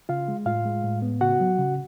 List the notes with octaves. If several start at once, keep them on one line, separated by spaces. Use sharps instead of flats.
C#3 F4 F5
G#3
A2 F4 F5
G#3
A2
B3
C#3 F#4 F#5
F#3
C#3